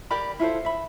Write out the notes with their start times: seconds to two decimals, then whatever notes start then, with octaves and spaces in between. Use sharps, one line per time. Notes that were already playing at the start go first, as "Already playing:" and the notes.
0.11 G4 A#4 D5 B5
0.40 E4 F4 A4 C5
0.65 E5 B5